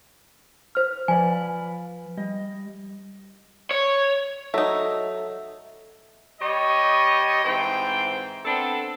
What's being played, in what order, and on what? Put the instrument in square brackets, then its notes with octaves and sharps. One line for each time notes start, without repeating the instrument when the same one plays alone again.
[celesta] C5 F6
[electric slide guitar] F3 B4 D5 [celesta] G#5
[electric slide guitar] G3 D#5
[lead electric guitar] C#5
[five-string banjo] F#3 D#4 [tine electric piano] A4 E5
[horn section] G3 G4 C#5 D#5
G#2 E3 C4 C5 G5
B3 C4 D4 A4